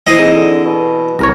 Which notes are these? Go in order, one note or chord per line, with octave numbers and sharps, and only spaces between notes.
E3 C5 D#5 D#6 C7 F#7
C4 D#4 G#4
D3
B2
C2 A#4 C#5 A#6